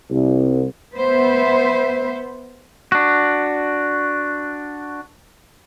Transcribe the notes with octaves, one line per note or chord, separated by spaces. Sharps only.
C2
B3 B4 C5 E5
D4 F#4